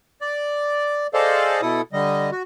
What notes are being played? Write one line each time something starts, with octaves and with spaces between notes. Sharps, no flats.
D5
G#4 A4 C5 D5 D#5 F5
B2 E4 A4 D#6
D3 G3 D#5
F#4